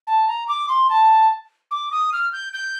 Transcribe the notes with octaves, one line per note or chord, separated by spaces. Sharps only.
A5
A#5
D6
C6
A5
D6
D#6
F6
G6
G6